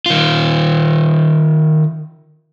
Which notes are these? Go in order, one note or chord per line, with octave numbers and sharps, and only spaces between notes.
D#3 F4